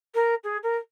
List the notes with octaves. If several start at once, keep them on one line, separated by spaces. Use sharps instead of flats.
A#4
G#4
A#4